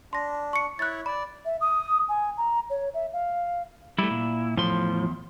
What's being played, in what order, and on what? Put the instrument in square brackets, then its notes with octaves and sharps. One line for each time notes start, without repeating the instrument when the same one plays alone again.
[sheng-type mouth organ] D4 [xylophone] C6 A#6
[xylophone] C#6 C#7
[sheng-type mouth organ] E4 C#5 [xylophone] F#6 A6
[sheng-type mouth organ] D5 [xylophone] B5
[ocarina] E5
D#6
G#5
A#5
C#5
E5
F5
[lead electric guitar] G3 A3 [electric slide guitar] E4
[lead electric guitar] A#2
[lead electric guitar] E2 C6 [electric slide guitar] A2 F3